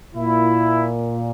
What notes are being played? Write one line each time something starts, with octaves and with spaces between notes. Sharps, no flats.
A#2 E4